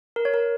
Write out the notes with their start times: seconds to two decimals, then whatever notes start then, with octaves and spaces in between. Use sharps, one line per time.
0.16 A#4
0.25 C#5
0.34 A#4